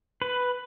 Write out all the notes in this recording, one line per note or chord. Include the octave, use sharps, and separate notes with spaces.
B4